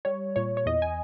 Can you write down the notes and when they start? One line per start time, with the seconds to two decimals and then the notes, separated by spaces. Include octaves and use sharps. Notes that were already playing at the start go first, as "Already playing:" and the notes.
0.05 G3 C#5
0.36 A#2 C#5
0.57 C#5
0.66 E2 D#5
0.82 G#5